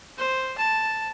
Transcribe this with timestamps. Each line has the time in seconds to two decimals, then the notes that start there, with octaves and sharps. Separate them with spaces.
0.18 C5
0.58 A5